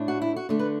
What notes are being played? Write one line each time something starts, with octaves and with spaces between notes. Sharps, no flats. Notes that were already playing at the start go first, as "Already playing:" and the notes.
Already playing: A2 A3 D4
F#4
E4
F#4
D3 A3 D4
B4